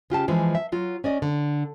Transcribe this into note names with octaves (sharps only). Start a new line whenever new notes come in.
C#3 F4 G4 A5
E3 F3 G#3
E5
F#3 F4
C#4 D5 D#5
D3